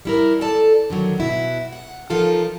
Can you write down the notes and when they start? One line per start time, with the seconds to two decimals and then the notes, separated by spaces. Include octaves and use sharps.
0.05 G3 E4 A#4
0.41 A4 D5 A5
0.90 D3 D#3 F#3
1.18 B2 E4 F#4
1.72 F#5
2.10 F3 D#4 F4 A4 A#4 A5